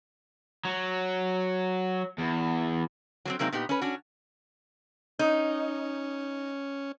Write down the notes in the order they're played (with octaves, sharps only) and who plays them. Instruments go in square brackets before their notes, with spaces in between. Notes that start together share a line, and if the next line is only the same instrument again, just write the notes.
[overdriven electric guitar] F#3
E2
[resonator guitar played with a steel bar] F#3 A#3 C4
C3 F#3 G#3 A#3 C4 D#4
A#2 B3 D#4 G4
C#4 B4
C#4 D4 F#4
[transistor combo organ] C#4 [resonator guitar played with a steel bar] D#4